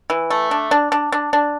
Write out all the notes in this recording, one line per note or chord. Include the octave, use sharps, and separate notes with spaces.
E3
A3
D4
D4
D4
D4
D4